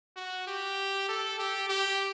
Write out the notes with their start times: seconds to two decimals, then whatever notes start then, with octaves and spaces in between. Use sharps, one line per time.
0.17 F#4
0.48 G4
1.09 A4
1.40 G4
1.69 G4